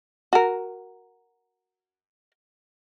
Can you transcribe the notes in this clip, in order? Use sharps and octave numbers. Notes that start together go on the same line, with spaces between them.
F#4 A#4